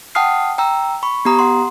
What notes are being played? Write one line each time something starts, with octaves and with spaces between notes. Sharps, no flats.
F#5 G5 A5 D#6 F6 C7
G5 A#5 E6
B5 C#6
B3 G4 A#5 D#6
F#5 C6